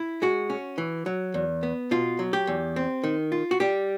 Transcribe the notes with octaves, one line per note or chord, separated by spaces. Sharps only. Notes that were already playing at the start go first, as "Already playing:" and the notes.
Already playing: E4
G#3 F#4
C#4
E3
F#3
E2
B3
B2 F4
F#3
G4
E2
C4
D#3
F4
F#4
G3 G4